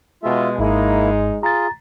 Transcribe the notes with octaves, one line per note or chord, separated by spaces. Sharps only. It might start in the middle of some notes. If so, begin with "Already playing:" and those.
B2 G#3 F4 E5
G#1 G#2 G#3 A#3 D#4 E4
F4 G#4 A#5 A6